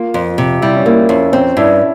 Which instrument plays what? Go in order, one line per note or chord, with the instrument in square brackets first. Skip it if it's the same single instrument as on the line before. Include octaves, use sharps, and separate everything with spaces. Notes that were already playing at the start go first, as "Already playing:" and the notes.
Already playing: [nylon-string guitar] A#3 [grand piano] F4
[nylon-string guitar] F2
C3
[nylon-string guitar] G3 [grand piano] E4
[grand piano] C#4
[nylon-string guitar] A#3 [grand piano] E4
[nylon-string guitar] F2 [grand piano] C#4
[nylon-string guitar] C4 [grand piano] C#4
[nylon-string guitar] G2 [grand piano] E4